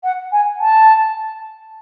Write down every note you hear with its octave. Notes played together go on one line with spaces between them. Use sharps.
F#5
G#5
A5